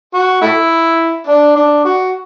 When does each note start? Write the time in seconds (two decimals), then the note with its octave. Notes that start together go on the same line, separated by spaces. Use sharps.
0.14 F#4
0.42 A3 E4
1.27 D4
1.56 D4
1.85 F#4